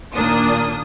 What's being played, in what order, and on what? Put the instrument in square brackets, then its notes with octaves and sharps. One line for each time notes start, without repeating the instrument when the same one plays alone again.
[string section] D#2 A#2 A#3 D4 D#6